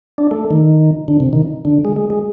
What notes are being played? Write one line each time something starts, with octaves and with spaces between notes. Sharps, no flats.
D4
A3
D#3
D3
C3
D#3
D3
G#3
G#3
G#3